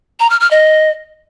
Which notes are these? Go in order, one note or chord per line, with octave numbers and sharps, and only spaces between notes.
A#5
F6
F6
D#5